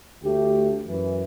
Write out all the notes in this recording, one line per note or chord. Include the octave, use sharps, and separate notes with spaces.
D2 A3 G4
F#2 E3